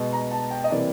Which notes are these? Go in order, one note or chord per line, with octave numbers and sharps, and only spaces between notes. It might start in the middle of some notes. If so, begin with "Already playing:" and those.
Already playing: B2 G#3 B3
A#5
A5
G5
D#5
C3 E3 G3 A#3 D5